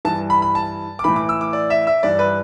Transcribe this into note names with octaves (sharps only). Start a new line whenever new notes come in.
G2 E3 A5
B5
B5
A5
D6
A2 E3 B5
D6
E6
D6
D5
E5
E5
G2 E3 D5
B4